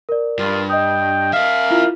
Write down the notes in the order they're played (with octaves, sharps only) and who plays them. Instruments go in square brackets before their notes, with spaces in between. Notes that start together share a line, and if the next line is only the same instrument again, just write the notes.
[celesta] A#4 D5
[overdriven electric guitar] G2 [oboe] F4
[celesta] D#5 D#6 [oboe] G5
[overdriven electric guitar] A#4 E5 [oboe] F5
[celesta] E4 F4 F6